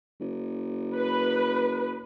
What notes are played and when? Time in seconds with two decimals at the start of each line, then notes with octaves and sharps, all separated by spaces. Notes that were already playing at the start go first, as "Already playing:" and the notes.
0.20 F#1
0.96 B4